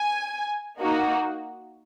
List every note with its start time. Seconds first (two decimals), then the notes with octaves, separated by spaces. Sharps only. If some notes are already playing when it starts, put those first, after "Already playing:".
Already playing: G#5
0.80 A#3 D#4 F#4